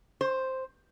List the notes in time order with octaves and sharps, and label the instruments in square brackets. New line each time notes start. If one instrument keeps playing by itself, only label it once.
[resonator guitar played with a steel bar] C5